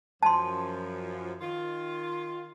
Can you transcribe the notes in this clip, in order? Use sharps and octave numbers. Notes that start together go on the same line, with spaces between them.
F#2 F3 A5 C6
D#3 F4